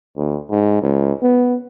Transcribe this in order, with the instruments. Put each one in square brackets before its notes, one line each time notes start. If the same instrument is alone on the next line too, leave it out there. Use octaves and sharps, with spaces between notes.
[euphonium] D2
G#2
C#2
B3